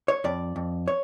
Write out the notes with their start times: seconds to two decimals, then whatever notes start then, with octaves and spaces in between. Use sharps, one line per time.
0.08 C#5
0.24 F2 D5
0.56 F2
0.88 C#5